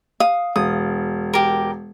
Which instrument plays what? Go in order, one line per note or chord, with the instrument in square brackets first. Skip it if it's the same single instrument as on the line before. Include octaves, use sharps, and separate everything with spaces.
[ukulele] F5 [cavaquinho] D#6
[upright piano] E1 [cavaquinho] D#6
[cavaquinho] G4 A#4